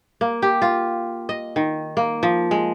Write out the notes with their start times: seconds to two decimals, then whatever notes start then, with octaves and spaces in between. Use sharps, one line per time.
0.21 A#3
0.42 G4
0.62 F4
1.29 D#5
1.56 D#3
1.97 A#3
2.23 F3
2.51 G#3